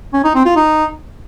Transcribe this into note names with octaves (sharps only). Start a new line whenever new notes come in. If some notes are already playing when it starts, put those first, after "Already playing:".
C#4
D#4
C4
F4
D#4